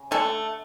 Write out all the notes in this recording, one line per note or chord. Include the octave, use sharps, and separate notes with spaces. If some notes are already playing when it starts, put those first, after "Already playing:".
Already playing: C#3
D3 A3 A4